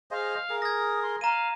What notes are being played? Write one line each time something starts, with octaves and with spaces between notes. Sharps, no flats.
G#4 C5 D#5 F5
G#4 A#4
D#6 G#6 A#6
C6
F5 A#5 D#7